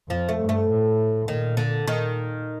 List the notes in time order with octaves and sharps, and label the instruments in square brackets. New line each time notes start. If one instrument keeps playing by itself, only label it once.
[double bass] F2 [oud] F3
[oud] A3
[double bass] G2
[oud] A3
[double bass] A2
[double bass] A#2 [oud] D#3
[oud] D3
[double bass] A#2 [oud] D#3